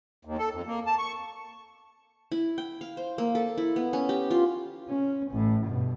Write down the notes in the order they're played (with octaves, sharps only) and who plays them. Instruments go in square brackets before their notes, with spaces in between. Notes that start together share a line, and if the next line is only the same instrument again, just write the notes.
[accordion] D#2
A4
F2
A#3
A5
C#6
[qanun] E4
G5
F5
C5
A#3
A4
E4
B3
C#4
G4
F4
[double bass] C#4
A1 A2
G2 B2